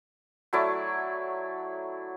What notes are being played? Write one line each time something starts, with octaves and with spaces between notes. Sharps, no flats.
F#3 A3 E4 D5